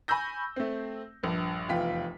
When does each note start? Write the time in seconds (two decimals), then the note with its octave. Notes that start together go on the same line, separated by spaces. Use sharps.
0.08 G#5 B5 C#6 E6 G6 A#6
0.56 A3 C4
1.23 A#1 G2
1.69 F1 E2 F4 G5 B6